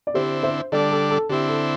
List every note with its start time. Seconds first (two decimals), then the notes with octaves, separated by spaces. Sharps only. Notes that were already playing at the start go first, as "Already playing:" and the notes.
0.07 D5
0.14 D3 C4 E4 G4 C5
0.43 C5 E5
0.72 D3 G3 D4 A4 D5
0.92 A4
1.11 A4
1.29 D3 C4 E4 G4
1.48 A4